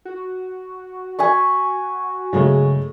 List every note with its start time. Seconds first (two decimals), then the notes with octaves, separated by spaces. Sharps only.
0.05 F#4
1.19 G#5 B5 C#6
2.33 G2 C#3 F#3 G#3 A3